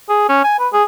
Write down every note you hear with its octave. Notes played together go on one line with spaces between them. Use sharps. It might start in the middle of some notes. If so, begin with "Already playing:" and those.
G#4
C#4
G#5
B4
G#4